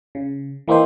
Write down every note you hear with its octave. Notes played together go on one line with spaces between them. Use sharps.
C#3
E3 A#3 C4 D#4 C5